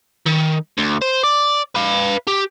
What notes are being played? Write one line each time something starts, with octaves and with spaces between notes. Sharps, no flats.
D#3
D2
C5
D5
B4 F5
G4